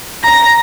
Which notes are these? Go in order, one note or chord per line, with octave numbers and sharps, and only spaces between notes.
A#5 A#6